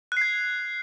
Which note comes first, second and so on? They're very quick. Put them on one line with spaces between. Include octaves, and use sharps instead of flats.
F#6 C7 G#6